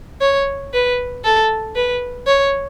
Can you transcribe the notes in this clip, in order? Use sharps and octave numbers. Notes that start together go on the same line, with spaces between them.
C#5
B4
A4
B4
C#5